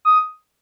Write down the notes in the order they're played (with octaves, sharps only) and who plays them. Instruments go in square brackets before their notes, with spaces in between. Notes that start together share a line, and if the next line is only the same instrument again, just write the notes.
[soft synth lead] D#6